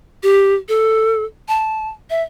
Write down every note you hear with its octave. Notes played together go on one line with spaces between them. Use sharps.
G4
A4
A5
E5